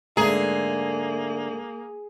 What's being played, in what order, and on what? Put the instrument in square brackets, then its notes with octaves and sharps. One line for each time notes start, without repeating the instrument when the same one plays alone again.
[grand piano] G#2 A3 [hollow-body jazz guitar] D3 A#5 [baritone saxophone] A#3 [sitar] G#4